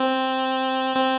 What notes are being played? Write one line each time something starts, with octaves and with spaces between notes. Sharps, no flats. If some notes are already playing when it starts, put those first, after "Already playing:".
Already playing: C4
C4